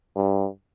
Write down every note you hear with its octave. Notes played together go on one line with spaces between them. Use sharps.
G2